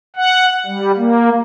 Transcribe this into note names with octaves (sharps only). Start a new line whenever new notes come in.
F#5
G3
A#3